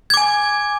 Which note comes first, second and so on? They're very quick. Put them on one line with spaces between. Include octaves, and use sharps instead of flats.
G#6 D6 G#5